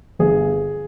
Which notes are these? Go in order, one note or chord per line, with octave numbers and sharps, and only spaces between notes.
G1 G#4